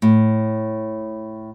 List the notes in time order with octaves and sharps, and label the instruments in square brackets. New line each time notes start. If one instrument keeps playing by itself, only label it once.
[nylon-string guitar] A2